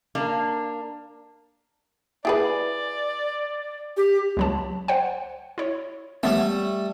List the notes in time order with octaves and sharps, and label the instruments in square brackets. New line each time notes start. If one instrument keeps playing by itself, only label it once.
[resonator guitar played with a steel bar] A#3 D4
[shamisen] E4 G#4 B4 [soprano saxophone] D5
[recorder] G4
[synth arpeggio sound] C#2 F#3 A5
C5 F#5 G5
E4 C#5
[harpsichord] G3 A3 [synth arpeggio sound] B3 C#5